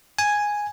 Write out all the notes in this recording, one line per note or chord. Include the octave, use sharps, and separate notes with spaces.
G#5